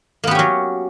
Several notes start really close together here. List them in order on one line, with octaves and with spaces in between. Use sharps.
A#3 B3 G4 C#4 F#3